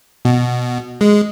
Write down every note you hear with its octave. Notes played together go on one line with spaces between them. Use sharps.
B2
G#3